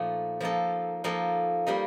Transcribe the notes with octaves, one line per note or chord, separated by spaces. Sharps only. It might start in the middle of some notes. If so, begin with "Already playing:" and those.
Already playing: A#2 F3 A3 D#4
F3 A#3 D#4 A4
F3 A#3 D#4 A4
G3 A#3 D#4 A#4